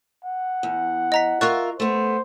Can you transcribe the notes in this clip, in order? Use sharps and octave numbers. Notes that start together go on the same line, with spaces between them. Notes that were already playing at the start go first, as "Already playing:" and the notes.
F#5
E2
D#5 A#5 B6
F4 A#4 E5 C#6 F#6 A6
A3 B3 C5